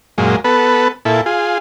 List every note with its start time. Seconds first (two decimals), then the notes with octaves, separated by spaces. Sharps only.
0.18 F#2 A#2 G#3
0.44 B3 A4 B4
1.05 A#2 E4 A4
1.26 F4 G#4